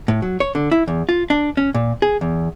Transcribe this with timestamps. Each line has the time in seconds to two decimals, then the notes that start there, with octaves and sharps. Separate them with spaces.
0.08 A2
0.22 F#3
0.40 C#5
0.55 D3
0.72 E4
0.88 E2
1.09 F4
1.30 D4
1.57 C#4
1.74 A#2
2.02 G#4
2.21 E2